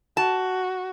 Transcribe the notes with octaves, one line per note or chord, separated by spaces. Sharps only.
F#4 A5